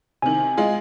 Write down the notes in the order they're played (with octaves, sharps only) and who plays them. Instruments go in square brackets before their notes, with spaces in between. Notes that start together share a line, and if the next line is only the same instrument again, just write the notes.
[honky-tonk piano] C3 D#3 [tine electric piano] G#5
[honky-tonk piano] G#3 F4 G#4